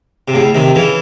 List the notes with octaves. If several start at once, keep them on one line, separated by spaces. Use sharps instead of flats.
C3
A2 C#3
C3 D#3
C#3 E3